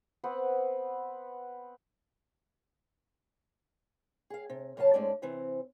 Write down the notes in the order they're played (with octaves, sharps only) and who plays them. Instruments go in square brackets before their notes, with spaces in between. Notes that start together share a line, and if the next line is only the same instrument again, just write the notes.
[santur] B3 C4 B4 F#5
[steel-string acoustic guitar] G#4 F5
C3
F#2 C#3 C#4 F5 A5
G#2 G#3 A3 C#4 D5 A5
C3 E3 C4